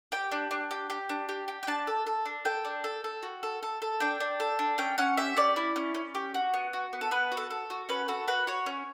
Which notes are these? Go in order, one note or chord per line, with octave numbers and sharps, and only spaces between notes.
G4 G5
D4
D4
G4
G4
D4
G4
G4
G5
D4 A5
A4
A4
D4
A4 G5
D4
A4
A4
F#4
A4
A4
A4
D4 G5
D4
A4
D4
C#4 G5
C#4 F#5
G4 E5
C#4 D5
E4
C#4
C#4
G4
F#4
B3
F#4
B3
A4
B3 B4
F#4
A4
A4
F#4
C#4 B4
F#4 A4
F#4 B4
F#4 C#5
C#4